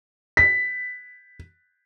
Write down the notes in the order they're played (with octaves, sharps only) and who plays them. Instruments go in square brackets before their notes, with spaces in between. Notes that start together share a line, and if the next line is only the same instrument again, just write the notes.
[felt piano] B6